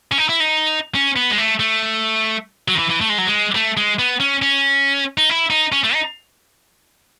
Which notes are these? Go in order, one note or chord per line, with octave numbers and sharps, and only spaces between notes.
C#4
D#4
E4
D#4
C#4
B3
G#3
A3
A3
F#3
D#3
E3
E3
A3
G#3
F#3
G#3
A3
G#3
B3
C#4
C#4
D#4
E4
D#4
C#4
A3
D#4